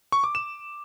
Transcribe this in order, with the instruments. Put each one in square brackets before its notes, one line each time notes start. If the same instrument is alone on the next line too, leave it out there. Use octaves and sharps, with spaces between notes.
[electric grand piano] C#6
D6
E7